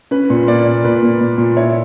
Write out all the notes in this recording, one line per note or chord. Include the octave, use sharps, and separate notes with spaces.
C#4 B4
A#2
A#3 D5
A#2
A#2 B4
A#3
A#2
A#2
E4 C#5